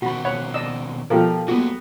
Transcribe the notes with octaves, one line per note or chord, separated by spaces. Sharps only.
B2 D#3 C4 F#4 B5
C#5 F#5 B5
D5 D#5 E6
B2 F3 G4 A4 A#4
F#3 A#3 B3 F#4 G#4